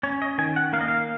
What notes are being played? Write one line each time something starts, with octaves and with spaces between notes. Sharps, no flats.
C#4 C#5
D#5
D#3 G#5
F#5
A#3 F5
D#5
F5